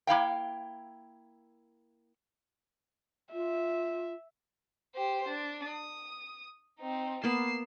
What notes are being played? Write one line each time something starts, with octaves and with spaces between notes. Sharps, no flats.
A#3 E4 F5 G5
F4 E5
G4 C5
D4
D#6
C4 D#4
A#3 B3 C7 E7